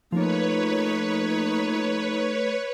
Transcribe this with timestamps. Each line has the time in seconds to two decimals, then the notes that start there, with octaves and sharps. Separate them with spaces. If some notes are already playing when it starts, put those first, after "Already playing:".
0.12 F3 A3 A#3 D#4 B4 C#5